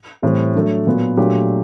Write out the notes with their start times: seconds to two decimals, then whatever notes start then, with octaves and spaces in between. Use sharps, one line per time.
0.22 A2 E3 G3 C4
0.55 F#3 A3 D4
0.87 A#2 F#3 B3
1.17 A#2 F#3 A3 D4 G4